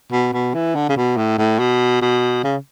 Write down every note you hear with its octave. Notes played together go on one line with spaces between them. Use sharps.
B2
B2
E3
D3
C#3
B2
A2
A2
B2
B2
C#3